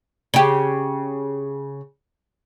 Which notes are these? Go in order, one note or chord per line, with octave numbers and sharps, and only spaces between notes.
C#3 G4